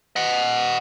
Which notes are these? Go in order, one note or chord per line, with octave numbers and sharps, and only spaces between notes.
D#5 F#5